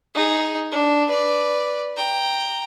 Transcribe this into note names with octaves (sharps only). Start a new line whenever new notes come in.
D#4 G#4
D4
B4 D5
G5 A#5